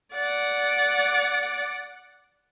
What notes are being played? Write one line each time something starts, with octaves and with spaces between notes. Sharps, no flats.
D5 F#5